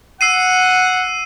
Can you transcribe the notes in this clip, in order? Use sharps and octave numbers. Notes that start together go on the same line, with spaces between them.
F#5 E6 C7 D#7